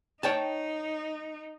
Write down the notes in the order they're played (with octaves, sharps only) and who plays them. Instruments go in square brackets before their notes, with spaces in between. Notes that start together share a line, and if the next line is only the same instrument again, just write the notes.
[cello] D#4 [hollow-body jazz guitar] C#5 G5 A5